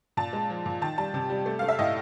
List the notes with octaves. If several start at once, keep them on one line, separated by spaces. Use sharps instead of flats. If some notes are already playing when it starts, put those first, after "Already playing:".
A#2 A5
G#3
F3
A#2
D#3 A5
G3 A5
C3
G3
A3
A3 F5
E5
A2 D#5